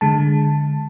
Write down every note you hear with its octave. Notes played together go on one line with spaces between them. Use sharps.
D3 G#3 A5